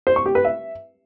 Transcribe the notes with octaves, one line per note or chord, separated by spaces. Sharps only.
C5
C#6
G4
B4
E5